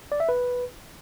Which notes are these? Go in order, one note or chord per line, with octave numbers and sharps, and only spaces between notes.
D5
E5
B4